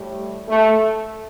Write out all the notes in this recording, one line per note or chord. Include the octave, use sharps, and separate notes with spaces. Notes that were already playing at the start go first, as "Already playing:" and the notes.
Already playing: A2 G3
A3